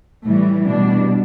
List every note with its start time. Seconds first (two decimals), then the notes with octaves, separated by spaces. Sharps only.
0.23 A2 E3 G3 A3
0.66 B2 G3 D4